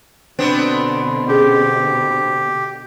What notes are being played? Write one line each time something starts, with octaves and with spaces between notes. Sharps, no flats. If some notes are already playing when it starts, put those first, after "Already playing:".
B2 D3 B3 C4 D4
C#4 G4 G#4